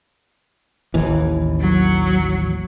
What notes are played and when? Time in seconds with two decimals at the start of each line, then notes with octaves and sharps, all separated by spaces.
0.94 A1 D#2 E3
1.60 F#3